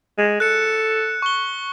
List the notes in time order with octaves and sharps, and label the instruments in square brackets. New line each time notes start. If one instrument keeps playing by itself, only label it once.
[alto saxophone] G#3
[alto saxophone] A4 [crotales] F#6 C#7
[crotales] C#6 G7